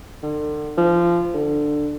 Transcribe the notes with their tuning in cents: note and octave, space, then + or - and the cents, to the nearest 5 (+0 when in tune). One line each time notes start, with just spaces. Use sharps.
D3 +35
F3 -20
D3 +10